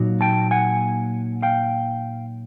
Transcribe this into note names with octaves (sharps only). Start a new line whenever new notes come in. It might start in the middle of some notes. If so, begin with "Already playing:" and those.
Already playing: A#2 F#3 A#3 D#4
G5 A5
F#5 G#5
F5 G5